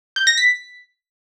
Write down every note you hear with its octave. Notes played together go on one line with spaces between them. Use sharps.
G6
A#6
B6